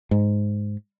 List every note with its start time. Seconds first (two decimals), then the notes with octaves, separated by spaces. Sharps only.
0.11 G#2